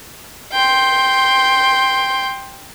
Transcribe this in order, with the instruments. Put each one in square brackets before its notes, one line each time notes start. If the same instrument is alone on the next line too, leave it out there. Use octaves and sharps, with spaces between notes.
[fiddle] G5 C6